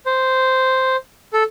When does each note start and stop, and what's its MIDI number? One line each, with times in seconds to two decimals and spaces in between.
0.06 0.96 72
1.33 1.43 69